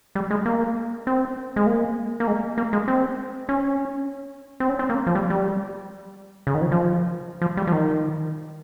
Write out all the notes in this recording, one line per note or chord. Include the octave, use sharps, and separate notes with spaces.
G3
G#3
A#3
C4
G#3
A#3
A#3
G#3
A#3
G#3
C4
C#4
C4
C#4
C4
A#3
F3
G3
G3
C#3
D#3
F3
F3
F3
G3
F3
D#3